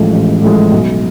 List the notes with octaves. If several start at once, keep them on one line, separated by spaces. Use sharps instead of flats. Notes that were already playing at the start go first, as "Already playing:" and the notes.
Already playing: A1 A2 F3 G#3
A1
A2 F3 G#3
B1